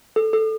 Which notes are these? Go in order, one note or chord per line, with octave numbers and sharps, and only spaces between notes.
A4
A4